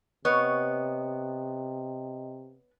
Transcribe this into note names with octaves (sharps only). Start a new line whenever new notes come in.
C3 B3 C#5 D#5